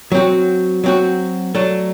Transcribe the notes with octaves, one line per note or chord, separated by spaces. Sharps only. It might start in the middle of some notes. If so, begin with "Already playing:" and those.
F#3 C4 F#4
F#3 C4 F#4
F#3 A3 D4